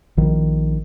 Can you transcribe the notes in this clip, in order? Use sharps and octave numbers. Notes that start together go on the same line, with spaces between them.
A#1 D#3